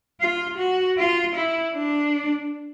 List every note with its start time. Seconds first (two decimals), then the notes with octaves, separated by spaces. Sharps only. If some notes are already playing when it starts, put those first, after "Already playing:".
0.21 F4
0.58 F#4
0.97 F4
1.35 E4
1.74 D4